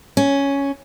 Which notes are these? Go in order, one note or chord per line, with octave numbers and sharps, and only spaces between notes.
C#4